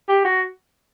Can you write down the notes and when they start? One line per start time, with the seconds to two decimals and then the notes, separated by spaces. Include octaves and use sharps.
0.09 G4
0.24 F#4